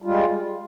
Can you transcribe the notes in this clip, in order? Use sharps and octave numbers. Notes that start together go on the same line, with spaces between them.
G3 G#3 F4